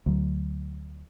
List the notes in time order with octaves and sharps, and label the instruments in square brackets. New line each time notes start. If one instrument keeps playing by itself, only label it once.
[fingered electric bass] D2 F#3